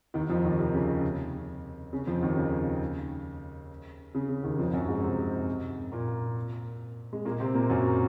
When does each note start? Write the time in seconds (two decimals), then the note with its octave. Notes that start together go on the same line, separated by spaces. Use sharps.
0.14 D#2 D#3
0.29 F2 F3
0.44 D#2 D#3
0.59 C3
0.74 C#3
1.93 C#3
2.07 F2 F3
2.22 D#2 D#3
2.36 C#3
4.15 C#3
4.29 C#3
4.44 D#2 D#3
4.59 F2 F3
4.73 F#2 F#3
4.88 G#2 G#3
5.03 C3 C4
5.92 A#2 A#3
7.13 G#3
7.25 A#2 A#3
7.40 C3 C4
7.55 A#2 A#3
7.70 F#2 F#3